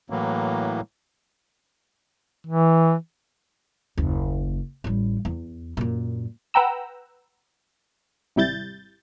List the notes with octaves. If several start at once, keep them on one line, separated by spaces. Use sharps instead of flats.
A2 E3 F#3 A#3
E3
F#1 D#2
A1 G3
E2
F#2 A#2
B4 F#5 G5 A#5 E6
G#1 C3 G3 E4 G6 A6